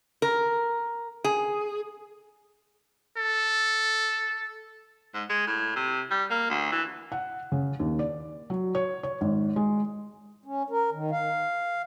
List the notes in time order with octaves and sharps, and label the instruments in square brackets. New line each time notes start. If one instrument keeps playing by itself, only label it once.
[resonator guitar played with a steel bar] A#4
G#4
[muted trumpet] A4
[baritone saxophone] G#2
G#3
A2
C3
G3
A#3
D2
E3
[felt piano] F#5
C#3
D#2
D5
F#3
C#5
C#5
G#1
G#3
[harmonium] C#4
A#4
D#3
F5